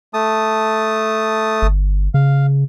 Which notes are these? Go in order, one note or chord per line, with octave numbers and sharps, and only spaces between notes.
A3 A5 D#6
G1
C#3 F5